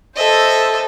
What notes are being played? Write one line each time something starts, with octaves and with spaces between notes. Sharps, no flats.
A4 C5 D#5 E5